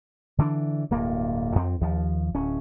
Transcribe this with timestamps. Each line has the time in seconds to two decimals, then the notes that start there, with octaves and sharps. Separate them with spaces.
0.38 D3 E3 C4 D4
0.91 D1 G2 A#3
1.55 F2 C4
1.81 D#2 F3
2.34 D1 C#4